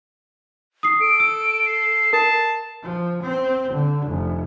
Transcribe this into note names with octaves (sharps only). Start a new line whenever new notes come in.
D#6 C7
A4 D7
E6
C7
A#4 A5
F3
C4
D3
F1